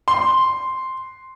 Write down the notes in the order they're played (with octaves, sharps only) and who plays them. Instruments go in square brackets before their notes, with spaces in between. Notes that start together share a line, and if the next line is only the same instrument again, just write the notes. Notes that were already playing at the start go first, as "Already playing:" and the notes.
[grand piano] C6